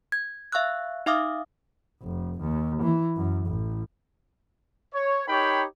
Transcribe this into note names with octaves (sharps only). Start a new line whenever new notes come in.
G#6
E5 F5 C#6 E6 F#6
D#4 E5 F5 D6 D#6 F6
F1
D#2
E3
F#2
A1
C#5
D#4 G4 A#4 C#5 G5 B5